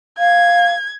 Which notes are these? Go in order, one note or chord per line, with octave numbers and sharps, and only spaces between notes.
F5 G#6